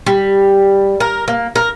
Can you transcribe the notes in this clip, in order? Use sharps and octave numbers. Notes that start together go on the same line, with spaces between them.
G3
A#4
A#3
A#4